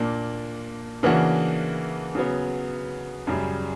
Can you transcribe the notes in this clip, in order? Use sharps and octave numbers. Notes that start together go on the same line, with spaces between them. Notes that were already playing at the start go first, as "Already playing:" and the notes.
Already playing: A#2 A#3 D4
C#3 E3 A#3 D4 F#4
C#3 F#3 B3
F#2 C#3 G3